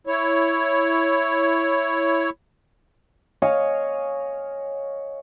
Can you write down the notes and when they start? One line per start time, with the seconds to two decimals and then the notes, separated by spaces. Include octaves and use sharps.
0.07 E4 C#5
3.42 C#5 D#5 F5 G#5